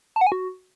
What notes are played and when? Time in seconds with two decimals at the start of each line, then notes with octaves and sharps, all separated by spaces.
0.16 A5
0.21 F#5
0.27 G#5
0.32 F#4